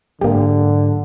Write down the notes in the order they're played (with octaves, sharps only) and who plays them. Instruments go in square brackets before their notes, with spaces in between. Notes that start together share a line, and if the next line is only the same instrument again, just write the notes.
[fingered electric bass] G#2 F#3 [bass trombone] D3 [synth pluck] A#3 G4